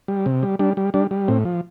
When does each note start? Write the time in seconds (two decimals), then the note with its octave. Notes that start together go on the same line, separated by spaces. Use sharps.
0.08 G3
0.26 C3
0.43 G3
0.59 G3 D4
0.77 G3
0.94 G3 D4
1.11 G3
1.28 A2 C4
1.45 F3